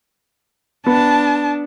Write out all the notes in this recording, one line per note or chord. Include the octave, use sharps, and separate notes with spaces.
B3 D4 A5